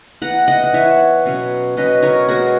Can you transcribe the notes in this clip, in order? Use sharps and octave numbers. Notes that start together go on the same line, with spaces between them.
E3 B3 F#5 A#5
D#5 F#5
F#5
E3 B3 C#5 E5
B2 F#3 C#4
B2 F#3 C#4 B4 D#5
A#4 C#5
B2 G#3 B3 F#4 A#4